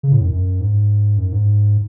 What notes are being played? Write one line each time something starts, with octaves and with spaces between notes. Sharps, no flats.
C#3
A2
F#2
F#2
G#2
F#2
G#2